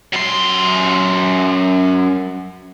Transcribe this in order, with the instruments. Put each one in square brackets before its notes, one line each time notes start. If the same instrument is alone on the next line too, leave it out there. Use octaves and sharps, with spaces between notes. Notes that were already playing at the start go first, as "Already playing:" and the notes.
[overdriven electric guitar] F#2 C6